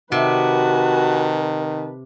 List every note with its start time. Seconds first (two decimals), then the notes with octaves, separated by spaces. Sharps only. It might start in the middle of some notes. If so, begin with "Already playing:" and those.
0.12 C3 D#3 F#4 B4 A5